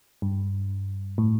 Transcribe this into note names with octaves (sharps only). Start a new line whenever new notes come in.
G2
A2